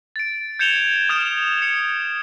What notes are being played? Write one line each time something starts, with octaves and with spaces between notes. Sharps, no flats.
A6 D7
G6 G#6 C#7 E7 F7 G7
D#6 F6 G#6 D7 E7
C#7